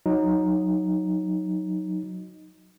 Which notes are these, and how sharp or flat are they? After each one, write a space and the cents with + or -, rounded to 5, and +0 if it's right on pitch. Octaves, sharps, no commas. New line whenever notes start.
F#3 -15 D#4 +0